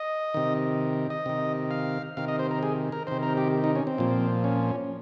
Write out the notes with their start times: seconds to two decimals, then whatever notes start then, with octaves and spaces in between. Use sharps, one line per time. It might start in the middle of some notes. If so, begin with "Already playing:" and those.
Already playing: D#5
0.34 C3 D#3
1.10 D#5
1.26 C3 D#3
1.71 F5
2.17 C3 D#3 F5
2.28 D#5
2.39 C5
2.51 A#4
2.63 G#4
2.92 A#4
3.07 C3 D#3 C5
3.23 A#4
3.37 G4
3.64 D#4
3.75 C#4
3.87 C4
3.98 A#2 F3
4.44 C#4